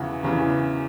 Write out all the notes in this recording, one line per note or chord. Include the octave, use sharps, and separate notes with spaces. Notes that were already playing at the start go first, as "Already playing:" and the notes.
Already playing: E2 C#3 E3 F#5
E2 C#3 E3